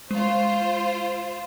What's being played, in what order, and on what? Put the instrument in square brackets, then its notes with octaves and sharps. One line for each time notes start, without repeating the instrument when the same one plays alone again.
[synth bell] G#3 [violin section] F4 C5